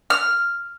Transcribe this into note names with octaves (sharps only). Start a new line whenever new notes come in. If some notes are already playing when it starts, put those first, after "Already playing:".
F6